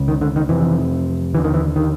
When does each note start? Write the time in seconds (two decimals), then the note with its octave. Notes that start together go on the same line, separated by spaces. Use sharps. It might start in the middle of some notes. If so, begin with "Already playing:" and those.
Already playing: C#2 C#3
0.08 D#3
0.21 D3
0.36 D#3
0.49 F2 C3 E3
1.34 D#2 D3 E3
1.44 D#3
1.54 E3
1.76 D#3